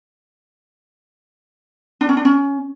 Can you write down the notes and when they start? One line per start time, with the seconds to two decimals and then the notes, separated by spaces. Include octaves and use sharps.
2.01 D4
2.09 C#4
2.17 D4
2.25 C#4